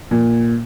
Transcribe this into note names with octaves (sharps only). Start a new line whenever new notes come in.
A#2